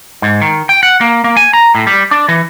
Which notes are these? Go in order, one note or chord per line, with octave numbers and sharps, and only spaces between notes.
G#2
D#3
G5
F#5
A#3
A#3
G#5
A#5
A2
G3
D4
E3